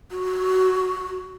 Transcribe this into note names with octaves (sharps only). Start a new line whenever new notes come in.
F#4